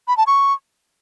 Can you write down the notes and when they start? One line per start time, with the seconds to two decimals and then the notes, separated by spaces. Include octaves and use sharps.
0.08 B5
0.17 A5
0.27 C#6